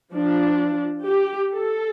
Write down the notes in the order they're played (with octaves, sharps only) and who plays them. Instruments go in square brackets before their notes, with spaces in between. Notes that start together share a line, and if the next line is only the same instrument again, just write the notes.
[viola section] F3 D4
G4
A4